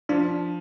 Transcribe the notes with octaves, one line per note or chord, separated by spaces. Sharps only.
F3 D4